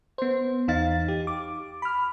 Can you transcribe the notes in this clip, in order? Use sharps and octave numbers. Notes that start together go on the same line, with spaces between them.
B3 C5
E2 D#4 F5 A6
G4
D6
B5 F6